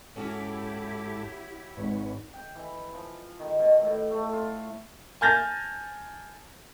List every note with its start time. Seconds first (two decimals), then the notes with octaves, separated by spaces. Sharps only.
0.16 G#2 C#4 E4 F#4 G4 A4 D6
1.77 G#1 G#2 B4 C#5
2.34 G5
2.55 E3
2.93 F3
3.39 D#3
3.59 B2
3.81 A2
4.11 A3
4.33 F4
5.21 G#5 A5 F6 G6 A6 A#6